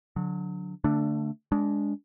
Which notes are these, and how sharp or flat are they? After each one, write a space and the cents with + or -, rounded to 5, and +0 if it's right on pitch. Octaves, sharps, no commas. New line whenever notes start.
D3 -10 F#3 -25
D3 -5 A3 +20 D4 +0
G#3 +0 D4 -20